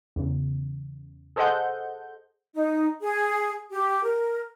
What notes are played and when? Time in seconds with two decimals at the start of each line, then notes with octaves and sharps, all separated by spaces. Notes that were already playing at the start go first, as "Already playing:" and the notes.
0.16 E2 C#3
1.36 G#4 A4 C5 D#5 F#5 G6
2.55 D#4
3.01 G#4
3.72 G4
4.03 A#4